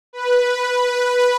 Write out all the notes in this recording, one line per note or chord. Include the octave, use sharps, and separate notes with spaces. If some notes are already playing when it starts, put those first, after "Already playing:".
B4